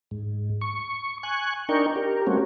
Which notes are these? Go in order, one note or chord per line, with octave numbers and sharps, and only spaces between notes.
G#2
C#6
G#5 C#6 F#6
D4 D#4 A#4 G5 C#6
G4 A#4
G3 A3 A#3 C4 C#4 F#4